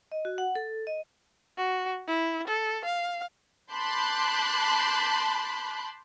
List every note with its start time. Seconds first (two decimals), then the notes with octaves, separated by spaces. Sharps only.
0.12 D#5
0.25 F#4
0.38 F#5
0.55 A4
0.87 D#5
1.58 F#4
2.07 E4
2.48 A4
2.85 F5
3.73 A5 B5 C6 D6 F#6 G6